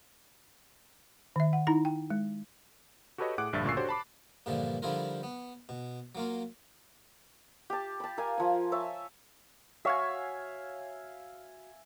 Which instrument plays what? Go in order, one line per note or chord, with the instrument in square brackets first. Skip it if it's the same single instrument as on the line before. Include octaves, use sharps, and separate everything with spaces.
[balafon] D#3 E5
F#5
D#4 E4 A#5
G5
G#3
[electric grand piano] F#4 G4 A4 B4 C#5 D#5
A2 G#4 F#5 D6 F#6 D7
A#1 G2 D3 E5 A6
D2 A#2 C#3 C#6 E6 C7
D4 F#4 G4 A4 C5 C#5
A5 B5 D6
[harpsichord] G2 A#2 D3 E3 F3
D3 F3 G3 E4 F4 A#4
B3
B2
F#3 A#3 F4
[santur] G4 A5
A5 B5
A#4 F5 G#5
F3 G#5
C#5 E5 G#5 A5
[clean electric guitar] F#4 C#5 [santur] E5 F5 G#5